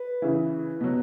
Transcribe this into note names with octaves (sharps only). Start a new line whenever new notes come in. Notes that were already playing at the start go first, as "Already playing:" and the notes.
Already playing: B4
C#3 E3
B2 F#3